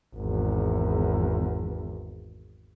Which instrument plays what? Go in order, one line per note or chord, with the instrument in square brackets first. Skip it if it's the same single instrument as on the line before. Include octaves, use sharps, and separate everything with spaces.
[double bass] G#1 E2